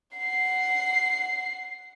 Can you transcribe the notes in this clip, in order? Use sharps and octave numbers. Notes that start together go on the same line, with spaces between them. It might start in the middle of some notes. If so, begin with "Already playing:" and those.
F#5 C7